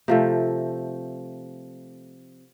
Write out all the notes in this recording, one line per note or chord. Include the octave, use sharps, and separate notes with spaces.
C3 F3 A3